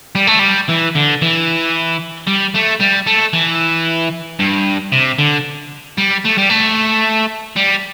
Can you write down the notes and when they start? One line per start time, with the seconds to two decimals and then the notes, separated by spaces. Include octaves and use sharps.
0.15 G3
0.27 A3
0.39 G3
0.69 E3
0.95 D3
1.22 E3
2.27 G3
2.54 A3
2.80 G3
3.07 A3
3.33 E3
4.40 G2
4.92 C3
5.19 D3
5.98 G3
6.25 A3
6.38 G3
6.49 A3
7.57 G3